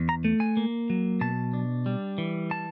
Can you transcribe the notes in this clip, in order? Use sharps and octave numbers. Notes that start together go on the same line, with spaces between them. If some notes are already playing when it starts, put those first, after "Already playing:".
Already playing: E2
A#5
A3
G#5
A#3
F#3
B2 A5
D4
G3
E3
A5